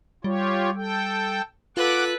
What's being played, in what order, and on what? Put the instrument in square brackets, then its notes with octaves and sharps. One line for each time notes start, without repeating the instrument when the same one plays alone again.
[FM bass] G3 [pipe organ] F4 G4 C#5
[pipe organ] A4 G5
[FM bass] F4 [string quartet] A4 B4 F#6 [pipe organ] F#5 D6